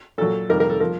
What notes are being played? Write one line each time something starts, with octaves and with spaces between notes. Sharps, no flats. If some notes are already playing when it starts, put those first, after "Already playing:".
A#2 F#3 A4
F2 C3 D#3 G3 A#4
A#4
A4
F3 A#4